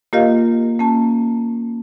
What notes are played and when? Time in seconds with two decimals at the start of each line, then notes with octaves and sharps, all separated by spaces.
0.13 A#3 F4 G4 A#4 D#5 F5
0.80 A#3 C#4 A5